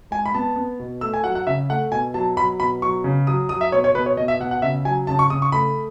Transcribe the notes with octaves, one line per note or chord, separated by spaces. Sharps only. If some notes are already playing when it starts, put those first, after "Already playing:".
G#3 G#5
B5
B3 A5
B3
B2
A3 E6
G#5
F#3 F#5
F#5
C#3 E5
A3 F#5
B2 G#5
F#3 A5
F#3 B5
B2 B5
F#3 C#6
C#3
F#3 D#6
F#3 D#6
E5
B2 C#5
C#5
B2 B4
C#5
B2 D#5
E5
B2 F#5
F#5
C#3 E5
F#3 G#5
C#3 A5
C#6
C#3 D#6
C#6
A3 B5